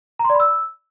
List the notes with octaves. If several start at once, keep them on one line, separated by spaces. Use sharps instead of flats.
A#5
C6
D5
B5
E6